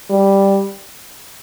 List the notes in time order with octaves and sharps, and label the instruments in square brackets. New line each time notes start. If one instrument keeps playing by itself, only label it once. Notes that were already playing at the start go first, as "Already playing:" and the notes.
[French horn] G3